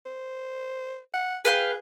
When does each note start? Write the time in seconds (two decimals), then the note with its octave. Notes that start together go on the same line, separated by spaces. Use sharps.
0.06 C5
1.14 F#5
1.45 G#4 B4 F5 G5